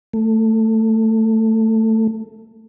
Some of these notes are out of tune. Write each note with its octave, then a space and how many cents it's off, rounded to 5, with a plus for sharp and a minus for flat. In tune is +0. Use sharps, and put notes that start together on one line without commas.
A3 +15